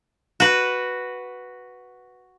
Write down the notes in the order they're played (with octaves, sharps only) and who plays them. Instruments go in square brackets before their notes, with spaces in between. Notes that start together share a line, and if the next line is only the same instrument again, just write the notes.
[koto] F#4 B4